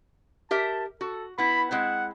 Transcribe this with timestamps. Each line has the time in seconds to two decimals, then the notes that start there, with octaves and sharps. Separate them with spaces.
0.51 G4 A#4 E5 A5
1.01 F#4 A4
1.38 B3 E4 B5
1.71 G#3 C4 E4 F#5